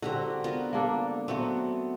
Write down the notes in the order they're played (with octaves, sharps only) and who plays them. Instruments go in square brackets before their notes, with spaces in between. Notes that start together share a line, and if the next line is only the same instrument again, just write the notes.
[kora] D3 C4 [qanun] F#4 G4 A#5
[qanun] B3 F4 A#4
[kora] A#3 D4 A4
[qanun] F#3 A3 B3 [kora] C4 F#4